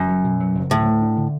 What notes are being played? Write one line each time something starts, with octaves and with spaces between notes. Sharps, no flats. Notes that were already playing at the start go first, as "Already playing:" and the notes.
Already playing: F#1 F#2
F#3
B2
F#3
F#1
D2 A2
A3
D4
D3